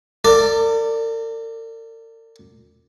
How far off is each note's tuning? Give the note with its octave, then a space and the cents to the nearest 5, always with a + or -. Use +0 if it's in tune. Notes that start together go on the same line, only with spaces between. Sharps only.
A#4 -45 D5 +0